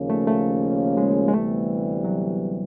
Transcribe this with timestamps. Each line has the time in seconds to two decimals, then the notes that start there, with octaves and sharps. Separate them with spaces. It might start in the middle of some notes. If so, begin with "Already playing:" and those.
Already playing: D#2 C#3 F3 A#3 C#4
0.10 A3
0.27 A3
0.97 G#3
1.28 G#3
1.33 D2 C3 E3 G3 A3 B3
2.05 F#3